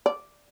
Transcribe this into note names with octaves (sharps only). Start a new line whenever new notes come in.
D5